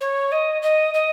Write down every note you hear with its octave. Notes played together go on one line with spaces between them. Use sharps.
C#5
D#5
D#5
D#5